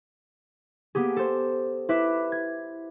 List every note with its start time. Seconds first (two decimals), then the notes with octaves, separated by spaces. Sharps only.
0.95 A#3 B3 G4 G#4
1.16 A4 C5
1.89 E4 B4 E5 D6
2.32 G#6